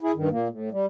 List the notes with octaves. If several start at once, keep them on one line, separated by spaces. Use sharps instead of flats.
E4 G#4
G2 D#3
A#2 A#3
A2
G3